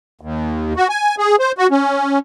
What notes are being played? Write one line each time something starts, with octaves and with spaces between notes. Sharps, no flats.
D#2
F#4
G#5
G#4
C5
F#4
C#4